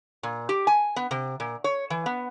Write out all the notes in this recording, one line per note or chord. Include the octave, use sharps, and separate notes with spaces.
A#2
G4
G#5
B3
C3
A#2
C#5
E3
B3